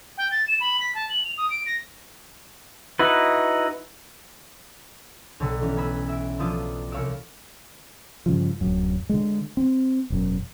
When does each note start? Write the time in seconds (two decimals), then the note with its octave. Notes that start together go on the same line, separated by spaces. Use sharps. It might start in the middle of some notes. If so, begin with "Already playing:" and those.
0.17 G5
0.31 A6
0.48 E7
0.60 B5
0.80 B6
0.95 A5
1.09 F#7
1.24 F7
1.37 D#6
1.50 D7
1.66 A#6
2.99 D#4 E4 F#4 B4
5.40 B1 D3 C#5
5.61 E3 C#4
5.76 B3 G#5 B5 E6
6.08 E5 D7
6.39 D3 F3 B3 D4 F4 D#6
6.91 C2 C#5 F5 E6 D7
8.26 G2 C#3 F3
8.61 D1 F#2
9.09 D3 G#3
9.57 C4
10.10 E1 F#2